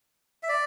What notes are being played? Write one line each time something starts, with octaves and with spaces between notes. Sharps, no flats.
E5
D5